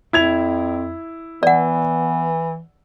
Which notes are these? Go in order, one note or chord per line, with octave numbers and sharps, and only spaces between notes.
F2 E4 G#6 F7
E3 B3 D5 F#5